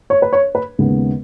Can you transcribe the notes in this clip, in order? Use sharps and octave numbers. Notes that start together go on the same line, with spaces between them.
C#5
B4
C#5
B4
D#2 C#3 G#3 B3